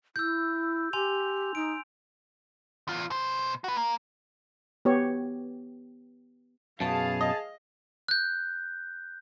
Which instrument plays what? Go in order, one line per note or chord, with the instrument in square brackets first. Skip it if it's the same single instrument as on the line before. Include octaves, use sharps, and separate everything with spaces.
[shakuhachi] E4 [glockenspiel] E6 G6
[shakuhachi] G4 [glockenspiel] G#5 C6 F7
[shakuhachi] D#4 [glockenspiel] D7
[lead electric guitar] E2 F4
B2 C5
F#4 B4
A#3
[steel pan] B3 G4 C#5
[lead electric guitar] F#2 B2 [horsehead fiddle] G#4 F5 [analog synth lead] A5
[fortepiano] D#5
[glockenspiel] F#6 G6